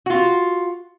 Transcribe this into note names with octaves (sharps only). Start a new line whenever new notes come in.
F4 F#4